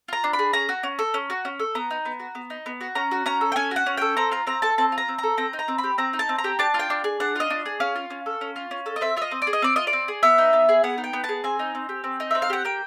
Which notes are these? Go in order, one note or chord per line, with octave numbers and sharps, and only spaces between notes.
F4 A#5
D4
B5
G#4
C#4 A#5
F#4
C#4
A4
C#4
F#4
C#4
A4
B3 A#5
D#4
B3
F#4
B3
D#4
B3
F#4
C#4 A#5
F#4
C#4 A#5
A4
G5
C#4 G#5
F#4 F#5
C#4
A4 G5
C4 A#5
F4 A#5
C4 A#5
A4 A5
C4 A5
F4
A#5
C4
A4 A#5
C4 A#5
D#4
A#5
C4
B5
G4
C4 A#5
D#4
A5
C4
A#5
G4
D4 A5
F4
G5
D4
G#4
D4 F#5
F4 D#5
D4
G#4
C#4 F5
F4
C#4
A4
C#4
F4
C#4
A4
D#5
C4 E5
F4 E5
D#5
C4
D5
G#4
D#5
C4 D5
F4 D#5
D5
C4
G#4
B3 E5
D#4
B3
G#4
B3 F#5
D#4
G5
B3
A5
G#4
C4 G#5
D#4
C4
G4
C4
D#4
C4 E5
F5
G4 F#5
A#3 G5